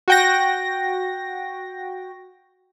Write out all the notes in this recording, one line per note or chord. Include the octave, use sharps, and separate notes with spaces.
F#4 G5 A#6